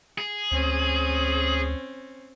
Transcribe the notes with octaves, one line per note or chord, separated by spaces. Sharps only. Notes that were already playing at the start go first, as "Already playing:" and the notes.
G#4
D2 C4 C#4